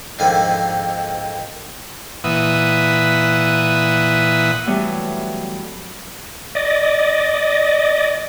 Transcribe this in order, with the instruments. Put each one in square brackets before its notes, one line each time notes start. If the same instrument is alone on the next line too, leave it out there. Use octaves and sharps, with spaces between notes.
[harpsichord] F2 G#2 D3 D#3 G#5 B5
[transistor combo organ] A#2 E3 B4 E5 F#5 D#6
[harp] E3 F#3 G3 A3 B3
[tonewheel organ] D5 D#5